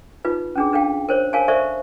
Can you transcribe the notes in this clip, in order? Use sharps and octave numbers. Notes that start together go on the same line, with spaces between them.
D#4 F4 B4
C#4 D4 G#4
D4 A4 F5 G5
A#4 C5 C#5
A#4 C#5 F5 G#5 A5
A4 A#4 C5 D5 E5 C#6